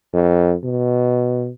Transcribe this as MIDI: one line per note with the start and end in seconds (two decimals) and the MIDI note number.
0.13 0.54 41
0.64 1.49 47